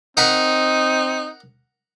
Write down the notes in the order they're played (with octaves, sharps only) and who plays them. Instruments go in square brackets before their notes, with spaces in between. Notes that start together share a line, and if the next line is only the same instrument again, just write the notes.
[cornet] C4 [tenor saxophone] D#4 [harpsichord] A#4 F#5 B5